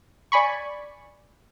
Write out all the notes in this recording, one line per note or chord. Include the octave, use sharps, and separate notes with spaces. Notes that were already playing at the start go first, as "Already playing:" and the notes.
D5 G#5 B5 C#6